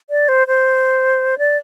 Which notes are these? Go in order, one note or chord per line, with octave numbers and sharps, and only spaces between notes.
D5
C5
C5
D5